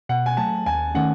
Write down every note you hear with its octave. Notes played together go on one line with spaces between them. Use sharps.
B2 F#5
G#5
F#3 A3 A5
D#2 G#5
D#3 A3 C#4 F#5